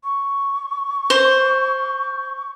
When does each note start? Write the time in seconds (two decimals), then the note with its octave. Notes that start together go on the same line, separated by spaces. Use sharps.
0.04 C#6
1.10 C5